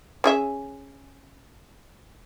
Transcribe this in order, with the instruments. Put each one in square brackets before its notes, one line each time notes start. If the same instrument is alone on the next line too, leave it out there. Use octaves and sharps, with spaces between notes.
[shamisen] C#4 G#4 E5